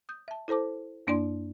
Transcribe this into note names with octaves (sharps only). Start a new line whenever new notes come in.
D#6 G6
E5 A5
E4 A4 C5 A5 D6
F#2 A#3 D4 E4 D5 C6